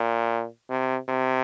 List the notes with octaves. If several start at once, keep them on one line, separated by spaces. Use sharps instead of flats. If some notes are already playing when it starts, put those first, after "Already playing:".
Already playing: A#2
C3
C3